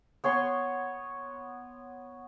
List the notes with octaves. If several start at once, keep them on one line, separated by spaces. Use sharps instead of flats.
B3 C#5 C6 C#6